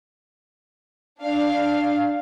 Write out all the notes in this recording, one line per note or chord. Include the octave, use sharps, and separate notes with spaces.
D4 F5